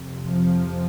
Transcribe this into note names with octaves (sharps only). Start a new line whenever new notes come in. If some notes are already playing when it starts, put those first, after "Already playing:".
Already playing: F2 C3
F3